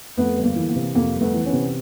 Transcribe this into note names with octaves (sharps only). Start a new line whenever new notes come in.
F2 A3 B3
G1
A#3
E3
A#3
C3
F2 A#3
G1
A3 B3
E3
B3 C#4
C3